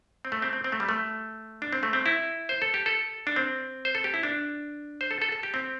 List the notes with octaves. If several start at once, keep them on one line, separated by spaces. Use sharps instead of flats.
C4
A3
C4
C4
C4
A3
G3
A3
D4
C4
A3
C4
E4
C5
A4
G4
A4
D4
C4
C5
A4
G4
E4
D4
C5
A4
A4
A4
G4
C4